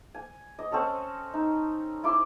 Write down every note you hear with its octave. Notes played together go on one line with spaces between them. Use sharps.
G#5
D#5
C4 C#4 A4 C#5
D#4
E4 C6 D6